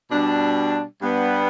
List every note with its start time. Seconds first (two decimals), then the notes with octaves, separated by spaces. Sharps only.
0.11 B2 G3 D4
1.02 G2 G3 B3